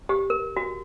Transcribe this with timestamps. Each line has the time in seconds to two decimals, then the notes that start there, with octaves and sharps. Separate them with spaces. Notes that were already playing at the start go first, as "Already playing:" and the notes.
0.09 G4
0.30 A#4
0.57 F#4